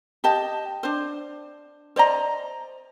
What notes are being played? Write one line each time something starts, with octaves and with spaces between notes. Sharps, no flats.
G4 D#5 A5
D4 C5
C5 D5 D#5 A#5